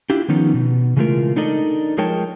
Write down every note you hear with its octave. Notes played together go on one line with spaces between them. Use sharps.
D4 E4 F4 G4
D#3 F3 B3 C#4 D#4
B2
C#3 E3 G#3 A3 F4 A#4
D4 D#4 A4 A#4 D5 D#5
F3 G#3 A#4 C#5 G5 A5